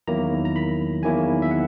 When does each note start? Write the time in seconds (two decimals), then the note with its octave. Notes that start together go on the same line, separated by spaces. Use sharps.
0.07 E2 D#3 F#3 A#3 E4 A#5
0.45 A#5
0.56 B5
1.03 E2 D#3 F#3 A#3 E4 G#5
1.42 E5
1.51 F#5